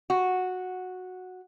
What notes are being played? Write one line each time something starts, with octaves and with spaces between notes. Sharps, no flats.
F#4